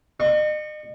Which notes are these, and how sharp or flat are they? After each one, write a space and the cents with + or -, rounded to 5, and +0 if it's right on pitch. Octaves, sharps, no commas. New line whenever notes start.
D#5 -40 C#6 +0